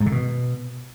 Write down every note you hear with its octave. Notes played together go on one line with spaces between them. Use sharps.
G#2
D3
B2